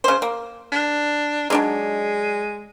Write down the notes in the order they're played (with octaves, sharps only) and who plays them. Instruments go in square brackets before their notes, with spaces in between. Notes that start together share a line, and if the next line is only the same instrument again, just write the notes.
[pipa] C#3 C5
A#3
[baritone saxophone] D4
[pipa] F#3 D4 D#4 [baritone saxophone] G#3